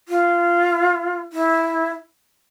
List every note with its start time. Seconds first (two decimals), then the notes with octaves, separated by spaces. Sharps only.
0.09 F4
1.33 E4